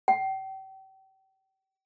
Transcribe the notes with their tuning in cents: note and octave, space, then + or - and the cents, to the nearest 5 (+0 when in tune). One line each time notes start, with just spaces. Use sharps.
G5 -40